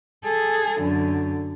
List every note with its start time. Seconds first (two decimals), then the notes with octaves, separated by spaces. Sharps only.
0.24 G#4 A4
0.81 F#2 D3